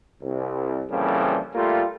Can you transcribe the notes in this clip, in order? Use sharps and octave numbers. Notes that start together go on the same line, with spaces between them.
C2
F2 A#2 C#3 E3 F3 G3
G3 A3 A#3 F4